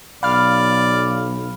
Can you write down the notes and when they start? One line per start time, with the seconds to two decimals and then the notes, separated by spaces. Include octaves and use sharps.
0.23 B1 D5 F5 B5 F6